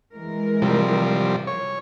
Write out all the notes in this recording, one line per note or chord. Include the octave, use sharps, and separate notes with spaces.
E3 G#3 A#4
C3 F3 G3
C#5